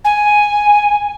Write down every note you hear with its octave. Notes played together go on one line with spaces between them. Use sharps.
G#5